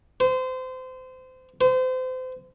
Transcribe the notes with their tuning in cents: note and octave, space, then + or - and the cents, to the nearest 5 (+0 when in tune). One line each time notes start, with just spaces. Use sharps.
C5 -25
C5 -30